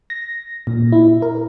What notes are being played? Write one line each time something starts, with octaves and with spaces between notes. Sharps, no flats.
A#6
A#2
E4
A#4